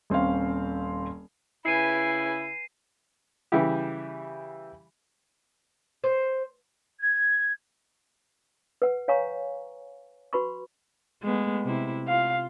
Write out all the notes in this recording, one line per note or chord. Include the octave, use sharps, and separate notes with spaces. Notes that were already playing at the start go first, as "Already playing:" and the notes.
D#1 C4 C#4 F5
C#3 E4 B4 G#5 C7 D#7
C#3 E3 G3 E4 G4
C5
G#6
B4 F#5
C#5 F5 G#5 A#5 C#6
F#4 B4 B5 C#6
G#3 A3 B3
C3 E4
F4 F5